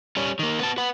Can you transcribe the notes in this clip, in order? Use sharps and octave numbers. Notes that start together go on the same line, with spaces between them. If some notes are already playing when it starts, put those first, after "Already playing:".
G3 C#4
D#3 A#3
B3 A5
B4 F#5